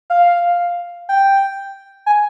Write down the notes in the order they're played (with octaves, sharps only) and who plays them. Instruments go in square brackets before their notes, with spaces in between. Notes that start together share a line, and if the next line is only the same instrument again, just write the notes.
[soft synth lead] F5
G5
G#5